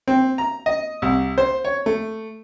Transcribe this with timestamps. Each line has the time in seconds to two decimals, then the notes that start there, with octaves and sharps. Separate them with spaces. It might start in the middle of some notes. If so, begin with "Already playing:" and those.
0.08 C4
0.38 A#5
0.66 D#5
1.02 C2
1.38 C5
1.65 C#5
1.86 A3